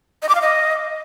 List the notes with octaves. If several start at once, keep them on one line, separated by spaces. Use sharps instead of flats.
D#5
D6
F5
D#5